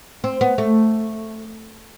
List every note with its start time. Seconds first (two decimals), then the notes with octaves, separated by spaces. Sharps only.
0.24 C4
0.41 B3
0.58 A3